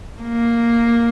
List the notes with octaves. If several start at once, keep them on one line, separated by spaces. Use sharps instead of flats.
A#3